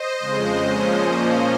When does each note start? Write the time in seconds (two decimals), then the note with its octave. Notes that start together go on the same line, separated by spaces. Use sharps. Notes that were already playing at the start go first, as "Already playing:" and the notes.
Already playing: C5 D#5
0.20 F2 C#3 G#3
0.61 A#2 F3 G#3 C#4
1.02 A#2 F3 A#3 C#4